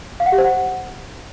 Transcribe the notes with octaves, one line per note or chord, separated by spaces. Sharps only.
F5
F#5
G4
C5
F#5